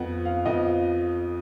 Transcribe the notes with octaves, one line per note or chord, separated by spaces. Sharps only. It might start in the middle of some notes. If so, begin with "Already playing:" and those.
Already playing: F2 F3 B3 F#5
F5
F2 F3 B3 D#5